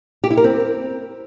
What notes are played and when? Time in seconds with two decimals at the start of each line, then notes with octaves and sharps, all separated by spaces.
0.24 G4
0.30 E4
0.37 A#4
0.44 C4